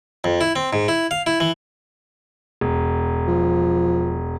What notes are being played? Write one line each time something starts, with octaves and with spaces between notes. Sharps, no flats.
F2
E4
C4
G#2
E4
F5
E4
E3
E1
F3